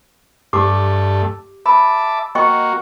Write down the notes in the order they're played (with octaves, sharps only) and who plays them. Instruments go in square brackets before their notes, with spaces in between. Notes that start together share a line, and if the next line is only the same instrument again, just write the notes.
[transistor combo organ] G2 A3 [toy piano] G4 D6
[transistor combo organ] E5 A5 D6 [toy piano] B5
[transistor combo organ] A#3 F#4 [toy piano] D#5 G5 C#6